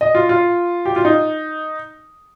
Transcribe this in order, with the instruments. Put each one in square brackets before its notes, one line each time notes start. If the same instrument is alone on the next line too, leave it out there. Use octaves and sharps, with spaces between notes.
[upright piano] D#5
F4
F4
G4
F4
D#4